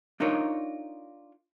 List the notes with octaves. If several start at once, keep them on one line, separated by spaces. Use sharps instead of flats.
D4 D#4 F4 A#4 C#5